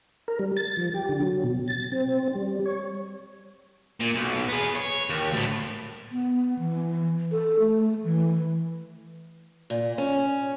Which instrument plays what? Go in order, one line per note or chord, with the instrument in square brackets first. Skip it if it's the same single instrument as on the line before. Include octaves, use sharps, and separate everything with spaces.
[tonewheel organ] A#4
G3
A6
F3
G4
D3
F#3
B2
A6
C4
G3
C#5
[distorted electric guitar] A#2
B1
B3 G#4
C#5
D#2
D2 A2
[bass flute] B3
E3
A4
A3
E3
[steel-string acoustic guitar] A#2
C#4